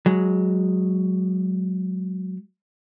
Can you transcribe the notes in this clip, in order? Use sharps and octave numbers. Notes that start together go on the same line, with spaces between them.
F#3 G#3